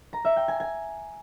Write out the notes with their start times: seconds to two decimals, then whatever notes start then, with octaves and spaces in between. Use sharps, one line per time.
0.13 A#5
0.25 E5
0.36 G5
0.48 G#5
0.60 G#5